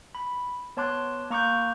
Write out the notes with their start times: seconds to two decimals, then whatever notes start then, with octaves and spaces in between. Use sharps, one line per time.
0.15 B5
0.77 B3 C#5 A5 C6 D6 F#6
1.30 A#3 A#5 C#6 D6 F#6 G6